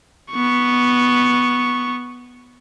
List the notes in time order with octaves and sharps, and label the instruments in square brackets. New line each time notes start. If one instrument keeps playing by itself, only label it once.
[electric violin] B3 C#6